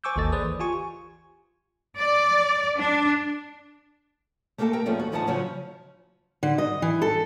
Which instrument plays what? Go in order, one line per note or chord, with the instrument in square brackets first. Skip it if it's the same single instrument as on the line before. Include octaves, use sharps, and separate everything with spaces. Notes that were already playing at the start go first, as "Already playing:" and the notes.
[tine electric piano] C5 G#5 C#6 D6 E6 G6
G#1 D#2 A#3 A4 D#5 A6
G#4 B4 C5 D5 D#6
E3
F4 G4 G#5 C#6
[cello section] D5
D4
[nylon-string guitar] A3 A#3 D#4 G4 A4 A5
A#4 G5
F3 G3 A3 B3 C#4 G#4
D#2 F#4
D2 E3 F3 D#4 F#5 A5
C#3 F3 F#3 C#4
[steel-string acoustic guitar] D3
D#5
E3
A4